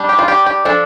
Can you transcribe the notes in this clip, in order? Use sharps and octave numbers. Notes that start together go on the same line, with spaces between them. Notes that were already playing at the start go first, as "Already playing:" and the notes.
Already playing: G3 D4
G4
F4
G4
G4
F3 D4 A4